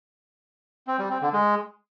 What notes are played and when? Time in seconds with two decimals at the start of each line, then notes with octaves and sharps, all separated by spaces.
0.87 C4
0.99 G3
1.10 C4
1.22 D3
1.33 G#3